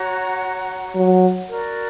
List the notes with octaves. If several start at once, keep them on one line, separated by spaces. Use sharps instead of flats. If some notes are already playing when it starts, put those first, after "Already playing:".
Already playing: F#4 C#5 F#5 A#5
F#3
F#4 A#4 D5